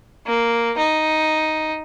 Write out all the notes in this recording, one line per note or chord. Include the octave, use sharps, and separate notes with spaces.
A#3
D#4